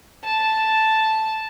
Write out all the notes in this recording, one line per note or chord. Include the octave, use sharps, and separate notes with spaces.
A5